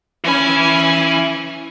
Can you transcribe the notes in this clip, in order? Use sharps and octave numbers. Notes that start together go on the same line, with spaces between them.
E3 C#4 G#5 B5